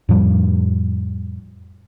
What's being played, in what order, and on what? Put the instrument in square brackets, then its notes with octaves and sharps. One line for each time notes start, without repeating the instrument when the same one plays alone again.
[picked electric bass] F2 A2 F3 G3